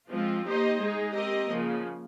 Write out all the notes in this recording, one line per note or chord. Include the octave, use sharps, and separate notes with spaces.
F3 G#3 C4 F4
A#3 D#4 G4 C5 D#5
G#3 D#4 G#4
C4 G4 A#4 D#5
C#3 F3 A#3